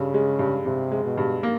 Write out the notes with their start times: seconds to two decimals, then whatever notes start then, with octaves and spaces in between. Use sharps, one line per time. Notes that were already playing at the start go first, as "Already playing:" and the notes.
Already playing: G2 C#3
0.14 G#3
0.39 G2
0.65 G2 C3
0.92 G#3
1.04 B2
1.17 G2
1.43 A#3